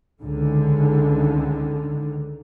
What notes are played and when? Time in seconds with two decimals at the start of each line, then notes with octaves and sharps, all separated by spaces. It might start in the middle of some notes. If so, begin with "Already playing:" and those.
0.22 C#2 D3 D#3